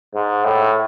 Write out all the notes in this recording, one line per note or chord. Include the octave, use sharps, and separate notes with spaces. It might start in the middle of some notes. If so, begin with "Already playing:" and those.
G#2
A2